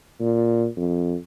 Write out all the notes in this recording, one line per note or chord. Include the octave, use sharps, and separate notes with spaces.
A#2
F2